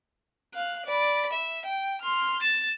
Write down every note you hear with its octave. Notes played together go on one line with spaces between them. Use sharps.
F5 F#6
D5 B5
E5
G5
C6 F6
A6 E7